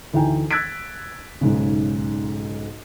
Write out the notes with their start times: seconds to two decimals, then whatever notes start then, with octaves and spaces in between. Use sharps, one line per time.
0.14 D2 E3 D#4 G5 G#5
0.51 E6 F#6 G#6 A6 B6 D7
1.41 B1 G#2 C#3